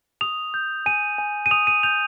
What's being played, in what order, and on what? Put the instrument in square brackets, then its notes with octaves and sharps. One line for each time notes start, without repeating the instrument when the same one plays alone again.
[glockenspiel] D#6 F7
G6
G#5 D#7
G#5
D#7
D#6 F7
D#7
G6 F7